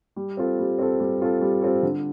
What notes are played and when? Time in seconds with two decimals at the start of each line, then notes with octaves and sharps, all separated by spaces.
0.16 G3
0.37 C4 F4 A4
0.59 G3
0.79 C4 F4 A4
1.00 G3
1.21 C4 F4 A4
1.41 G3
1.62 C4 F4 A4
1.83 D3